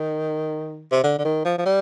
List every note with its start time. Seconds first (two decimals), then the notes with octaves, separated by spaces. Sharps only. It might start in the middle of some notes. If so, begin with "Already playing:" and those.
Already playing: D#3
0.92 C3
1.03 D3
1.18 D3
1.25 D#3
1.45 F3
1.58 F3
1.65 G3